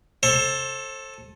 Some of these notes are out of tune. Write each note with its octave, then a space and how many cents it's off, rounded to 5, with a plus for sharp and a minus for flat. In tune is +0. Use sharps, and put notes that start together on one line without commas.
A4 +0 C5 +35